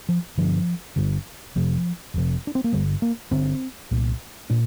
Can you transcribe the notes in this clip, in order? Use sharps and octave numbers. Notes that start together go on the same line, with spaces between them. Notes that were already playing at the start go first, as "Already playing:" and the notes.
F3
G1 G2 D3 F3
G1 G2 D3
F1 F2 C3 F3
F1 F2 C3
D4
C4
A#3
G1 G2 D3 G3
A#3
G1 G2 D3 C4
C2 A#2
A#2 D4